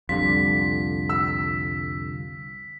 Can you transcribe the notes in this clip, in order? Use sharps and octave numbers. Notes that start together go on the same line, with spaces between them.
C2 F2 D3 G3 F4 B6
E6